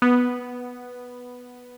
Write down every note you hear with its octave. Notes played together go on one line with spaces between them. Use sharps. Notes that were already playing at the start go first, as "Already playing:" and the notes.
B3